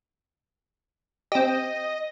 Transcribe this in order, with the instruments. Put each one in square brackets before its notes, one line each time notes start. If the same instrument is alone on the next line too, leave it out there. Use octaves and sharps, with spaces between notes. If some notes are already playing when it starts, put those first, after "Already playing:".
[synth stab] C4 G4 [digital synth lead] D#5